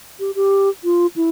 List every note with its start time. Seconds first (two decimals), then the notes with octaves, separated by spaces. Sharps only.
0.20 G4
0.35 G4
0.84 F4
1.16 E4